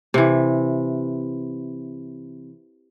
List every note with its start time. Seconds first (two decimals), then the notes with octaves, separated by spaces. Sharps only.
0.14 C3 E3